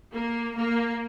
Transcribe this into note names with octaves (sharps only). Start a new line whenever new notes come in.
A#3
A#3